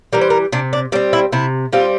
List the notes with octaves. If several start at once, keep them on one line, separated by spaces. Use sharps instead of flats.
E3 G3 A#4
C5
A#4
C3 D4
D4
G3 C4 D4
E4
C3 E4
G3 C4 F4